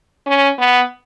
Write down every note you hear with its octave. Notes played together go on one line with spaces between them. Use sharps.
C#4
B3